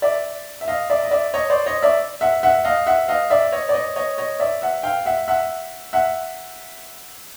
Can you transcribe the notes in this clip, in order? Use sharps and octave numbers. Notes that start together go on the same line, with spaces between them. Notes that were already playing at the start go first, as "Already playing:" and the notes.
D5 E5
E5
D#5 F5
D5 E5
D#5
D5 E5
C#5 D#5
C5 D5
C#5 D#5
D5 E5
E5 F#5
E5 F#5
D#5 F5
E5 F#5
D#5 F5
D5 E5
C#5 D#5
D5
C#5 D#5
C#5 D#5
C#5 D#5
D5 E5
E5 F#5
F5 G5
E5 F#5
E5 F#5
E5 F#5